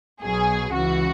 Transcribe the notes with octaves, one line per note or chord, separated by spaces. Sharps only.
B1 B2 F#3 G#4
C#2 C#3 E3 F#4